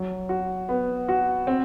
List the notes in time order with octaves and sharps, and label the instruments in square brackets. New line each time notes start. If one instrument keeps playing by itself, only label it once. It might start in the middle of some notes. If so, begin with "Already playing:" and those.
Already playing: [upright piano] F#3
F#4
B3
F#4
C4